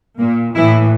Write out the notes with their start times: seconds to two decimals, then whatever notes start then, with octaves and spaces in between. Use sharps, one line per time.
0.18 A#2 A#3
0.54 A2 E3 E4